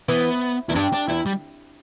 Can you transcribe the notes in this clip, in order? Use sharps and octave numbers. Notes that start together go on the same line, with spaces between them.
E3 B3
E2 E4
G2 D4
D4
E2 E4
G3